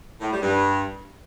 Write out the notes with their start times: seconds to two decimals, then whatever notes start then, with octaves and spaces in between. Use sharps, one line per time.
0.20 A2
0.31 G3
0.42 G2